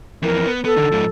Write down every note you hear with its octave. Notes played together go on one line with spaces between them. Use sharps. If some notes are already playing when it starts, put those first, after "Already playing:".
F2 E3 A#4
B3
B3 A4
D3 D#3
G#2 F3